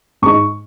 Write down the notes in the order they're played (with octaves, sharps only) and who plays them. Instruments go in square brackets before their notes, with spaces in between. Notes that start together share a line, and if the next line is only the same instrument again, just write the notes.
[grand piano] G#2 G#3 D#4 C#6